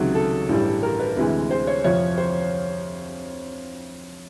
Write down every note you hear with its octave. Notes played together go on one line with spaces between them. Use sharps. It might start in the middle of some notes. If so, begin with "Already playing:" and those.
Already playing: C#2 C3 D#3 F#3 G#4
A4
A1 G2 E3 G3
A#4
B4
D2 C3 E3 G#3
C5
C#5
F2 C3 F3 C#5
C5